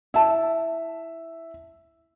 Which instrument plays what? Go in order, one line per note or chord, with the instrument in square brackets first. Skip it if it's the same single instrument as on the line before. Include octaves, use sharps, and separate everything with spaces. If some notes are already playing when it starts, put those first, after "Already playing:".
[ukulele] E4 A5 [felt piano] E5